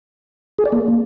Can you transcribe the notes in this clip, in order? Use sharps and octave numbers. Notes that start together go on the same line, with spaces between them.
G#4
D5
A#3